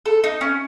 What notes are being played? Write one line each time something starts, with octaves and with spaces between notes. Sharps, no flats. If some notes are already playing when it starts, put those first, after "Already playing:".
A4
D#4
C#4